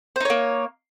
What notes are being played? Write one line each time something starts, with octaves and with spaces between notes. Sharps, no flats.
A#3 D#4 C5 C#5